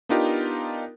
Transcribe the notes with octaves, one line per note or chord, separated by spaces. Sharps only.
B3 D4 D#4 F4 G4 A#4